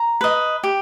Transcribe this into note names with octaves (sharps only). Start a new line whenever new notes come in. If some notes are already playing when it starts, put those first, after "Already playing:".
Already playing: A#5
B4 D#5
G4